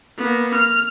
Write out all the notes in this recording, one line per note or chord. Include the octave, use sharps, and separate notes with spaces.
A#3 B3
F6